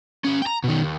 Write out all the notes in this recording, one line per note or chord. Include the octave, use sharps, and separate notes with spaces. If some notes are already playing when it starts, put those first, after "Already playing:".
C#4 G4
G5 A#5
B2 D#3
D#2